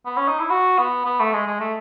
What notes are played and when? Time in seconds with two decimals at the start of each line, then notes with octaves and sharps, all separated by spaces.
0.06 B3
0.17 C#4
0.28 D#4
0.39 E4
0.50 F#4
0.78 B3
1.05 B3
1.20 A3
1.33 G#3
1.47 G#3
1.60 A3